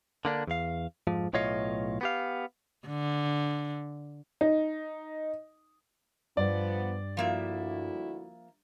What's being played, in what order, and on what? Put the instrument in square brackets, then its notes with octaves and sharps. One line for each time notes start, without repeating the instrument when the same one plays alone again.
[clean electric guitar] D3 A#3 D4
E2 F5
F2 G#2 F3
B1 A2 F4 C#5 D#5 F5
B3 G4 F5
[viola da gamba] D3
[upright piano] D#4
[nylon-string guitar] G2 [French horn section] F3 B3 [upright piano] D5
[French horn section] D2 E4 F#4 [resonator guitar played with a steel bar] F3 A#3 E5